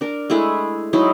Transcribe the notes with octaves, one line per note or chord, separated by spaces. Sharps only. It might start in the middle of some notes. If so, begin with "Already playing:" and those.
D4 A#4
G#3 A3 E4 G#4
F#3 G#3 D#4 E4